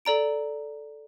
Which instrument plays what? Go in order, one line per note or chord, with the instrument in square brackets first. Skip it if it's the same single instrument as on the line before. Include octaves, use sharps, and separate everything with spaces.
[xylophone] A4 D5 A#5 D7